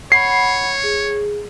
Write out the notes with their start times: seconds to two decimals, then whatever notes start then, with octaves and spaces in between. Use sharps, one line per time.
0.12 C#5 F#5 B5 C7
0.83 G#4